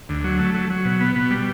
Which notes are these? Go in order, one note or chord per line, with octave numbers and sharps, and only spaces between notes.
D2
F#3
A3
F#3
F#3
B2
B3
B2
G3